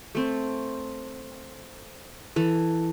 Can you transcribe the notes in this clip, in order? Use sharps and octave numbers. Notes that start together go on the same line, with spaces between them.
A3 C4
E3 A4